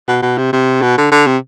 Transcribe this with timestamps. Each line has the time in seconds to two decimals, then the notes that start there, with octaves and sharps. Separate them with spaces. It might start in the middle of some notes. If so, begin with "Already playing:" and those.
0.08 B2
0.22 B2
0.38 C3
0.53 C3
0.82 B2
0.98 D3
1.12 D3
1.27 C3